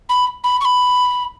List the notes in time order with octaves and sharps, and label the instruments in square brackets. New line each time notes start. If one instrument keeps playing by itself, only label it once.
[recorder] B5
B5
C#6
B5